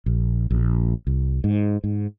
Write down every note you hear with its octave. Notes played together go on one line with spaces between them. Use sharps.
A#1
A#1
C2
G#2
G#2